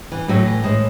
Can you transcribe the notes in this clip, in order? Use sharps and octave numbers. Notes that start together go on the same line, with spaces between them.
E3
A2 F#3 A3
E3
A2 G#3